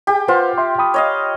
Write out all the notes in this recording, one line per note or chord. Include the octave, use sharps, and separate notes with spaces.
G4 G#4 G5 G#5
F4 B4 C5 F#5
E5 G5 C6
G5 B5 D#6
C#5 D#5 F5